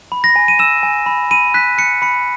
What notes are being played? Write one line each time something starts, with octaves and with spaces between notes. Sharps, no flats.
B5
A#6
G#5
D#7
E6 E7
G#5
B5
B5 D#7
F#6 B6
F#6 C#7
B5 C#7